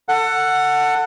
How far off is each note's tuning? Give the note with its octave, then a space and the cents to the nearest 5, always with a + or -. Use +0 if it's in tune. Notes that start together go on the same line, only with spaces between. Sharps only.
A4 +25 F#5 +0